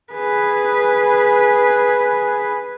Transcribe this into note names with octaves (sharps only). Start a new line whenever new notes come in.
G#4 B4